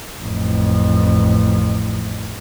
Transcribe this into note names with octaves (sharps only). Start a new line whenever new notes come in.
A1 F2